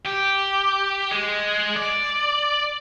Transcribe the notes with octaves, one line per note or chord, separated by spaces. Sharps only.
G4
G#3
D5